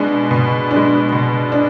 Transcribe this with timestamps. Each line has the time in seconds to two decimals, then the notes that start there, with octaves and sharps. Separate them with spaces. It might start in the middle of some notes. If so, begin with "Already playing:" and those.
Already playing: B2 G#3 D4
0.31 B2
0.71 D4
0.76 G#3
1.12 B2
1.52 D4